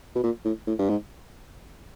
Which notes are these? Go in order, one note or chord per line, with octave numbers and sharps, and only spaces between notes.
B2
A#2
A2
A2
G2
G#2